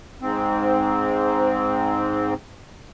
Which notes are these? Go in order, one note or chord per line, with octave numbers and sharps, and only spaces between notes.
G#2 C4